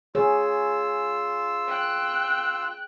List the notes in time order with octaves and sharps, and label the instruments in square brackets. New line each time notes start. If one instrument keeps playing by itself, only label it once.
[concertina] F4 E6 [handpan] G#4 C#5
[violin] G5 F#6